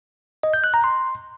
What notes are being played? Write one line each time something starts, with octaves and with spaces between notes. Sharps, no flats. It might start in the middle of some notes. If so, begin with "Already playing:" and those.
D#5
G6
F#6
A#5
C6